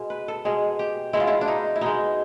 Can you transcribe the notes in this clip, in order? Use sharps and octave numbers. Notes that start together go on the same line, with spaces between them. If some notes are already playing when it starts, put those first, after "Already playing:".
Already playing: B2 G#3
B4
A4
B2 G#3 G#4
G4
B2 G#3 E4
F4
E4
D4
D#4
E4
B2 G#3 D#4